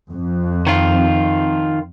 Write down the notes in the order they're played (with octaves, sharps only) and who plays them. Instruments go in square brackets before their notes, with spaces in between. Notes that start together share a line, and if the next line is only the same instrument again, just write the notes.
[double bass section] F2
[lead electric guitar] D#3 F4